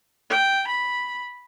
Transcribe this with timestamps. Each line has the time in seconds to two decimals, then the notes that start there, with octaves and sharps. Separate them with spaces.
0.30 G5
0.68 B5